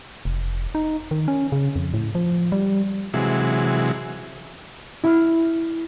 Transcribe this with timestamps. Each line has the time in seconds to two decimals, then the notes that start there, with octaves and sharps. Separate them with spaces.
0.25 F1
0.75 D#4
1.11 D#3
1.28 C#4
1.52 C#3
1.76 F2
1.94 A2
2.15 F3
2.52 G3
3.14 C3 E3 F#3 G#3
5.04 E4 F6